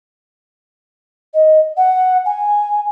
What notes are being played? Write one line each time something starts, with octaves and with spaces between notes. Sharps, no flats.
D#5
F#5
G#5